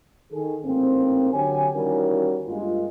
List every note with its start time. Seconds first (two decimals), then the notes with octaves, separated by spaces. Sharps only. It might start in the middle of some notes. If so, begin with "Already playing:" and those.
0.33 D#3 G#4 A4
0.65 A1 G#2 A#3 C4
1.33 D3 F#3 G4 C#5 G#5
1.75 D#3 E3 G3 C#4 F#4 A#4
2.47 G2 G#3 A#3 F4